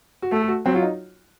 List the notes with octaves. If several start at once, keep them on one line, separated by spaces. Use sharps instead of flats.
F#4
A3 A4
A4
F#4
F#3 C4
F4
D#4